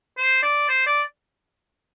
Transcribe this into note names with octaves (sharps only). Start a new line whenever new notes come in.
C5
D5
C5
D5